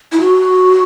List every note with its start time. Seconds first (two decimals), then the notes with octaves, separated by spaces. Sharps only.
0.12 E4
0.20 F#4